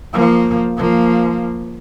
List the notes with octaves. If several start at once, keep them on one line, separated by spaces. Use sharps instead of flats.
F3 A#3
F3 A#3